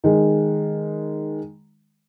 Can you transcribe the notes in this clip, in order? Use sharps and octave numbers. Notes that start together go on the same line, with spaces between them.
D#3 G#3